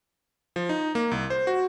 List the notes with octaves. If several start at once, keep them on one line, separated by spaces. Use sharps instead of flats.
F3
D#4
A#3
C2
C5
F#4